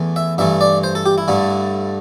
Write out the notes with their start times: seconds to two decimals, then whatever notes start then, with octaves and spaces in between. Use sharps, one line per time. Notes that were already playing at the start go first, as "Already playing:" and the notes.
Already playing: E2 E3 A3
0.16 E5
0.38 G2 E3 A3 E5
0.61 D5
0.84 C5
0.95 A4
1.06 G4
1.18 E4
1.28 G2 D3 A3